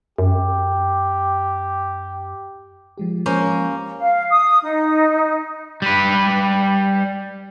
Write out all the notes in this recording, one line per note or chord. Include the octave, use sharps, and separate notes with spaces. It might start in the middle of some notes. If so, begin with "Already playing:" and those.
F#2 G4
F3 G#3 G4
A#3 C#4 C5
F5
D#6
D#4
G3 B4